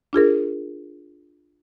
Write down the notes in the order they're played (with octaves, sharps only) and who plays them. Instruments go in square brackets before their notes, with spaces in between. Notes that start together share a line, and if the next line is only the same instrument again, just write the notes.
[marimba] D4 F4 G#4 A#4